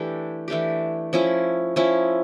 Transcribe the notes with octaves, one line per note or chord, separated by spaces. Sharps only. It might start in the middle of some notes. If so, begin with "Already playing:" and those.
Already playing: E3 A3 D4 G4
E3 A3 D4 G4
F3 C#4 E4
F3 C#4 E4